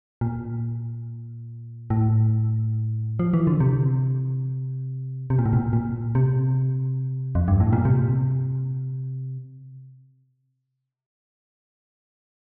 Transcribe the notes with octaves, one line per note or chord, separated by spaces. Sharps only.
A#2
A2
F3
E3
D3
C3
C3
A#2
A2
A#2
A#2
C3
F2
G2
A2
A#2
C3